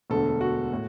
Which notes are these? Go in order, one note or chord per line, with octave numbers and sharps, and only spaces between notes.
E1 D2 D3 A4
F#4
A2